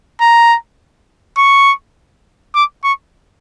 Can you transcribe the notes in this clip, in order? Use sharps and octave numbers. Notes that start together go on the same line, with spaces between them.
A#5
C#6
D6
C#6